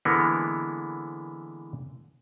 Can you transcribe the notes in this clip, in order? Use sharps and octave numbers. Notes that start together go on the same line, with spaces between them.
D3 E3 G#3 A#3 B3